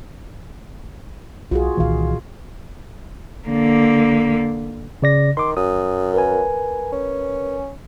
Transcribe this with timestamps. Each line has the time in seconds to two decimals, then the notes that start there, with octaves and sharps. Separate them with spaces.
1.51 B1 F4 F#4 G#4
1.77 C2 A#2 D#3 E3 F5
3.48 D3 A#3
5.02 C#3 D5 A#6
5.37 D#3 C6 D6
5.57 F#2 D#6
6.14 A#4 B4 G#5
6.92 C#4